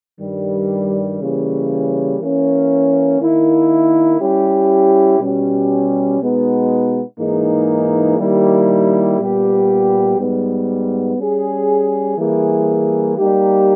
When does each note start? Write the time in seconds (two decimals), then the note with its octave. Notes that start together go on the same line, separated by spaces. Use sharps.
0.21 G2 D#3 G3
1.21 C#3 E3 G3 A#3 C#4
2.21 E3 A#3 C#4
3.20 D#3 A#3 E4
4.20 G3 C#4 E4 G4
5.20 B2 G3 C#4 G4
6.20 B2 G#3 B3 D#4
7.19 G#2 E3 A#3 D#4 G#4
8.18 D#3 G3 A#3 E4 G4
9.19 A#2 G3 B3 G4
10.19 G#2 G3 B3
11.18 G3 C#4 G#4
12.18 E3 G3 A#3 E4 G#4
13.18 G3 A#3 D#4 G4